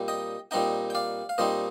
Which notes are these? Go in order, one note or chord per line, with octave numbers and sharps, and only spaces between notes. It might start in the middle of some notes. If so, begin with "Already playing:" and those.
Already playing: A#2 G3 C4 D#4
D#5 G5
A#2 G3 C4 D#4 D#5 G5
G5
D5 F5
F5
A#2 G3 C4 D#4 C5 D#5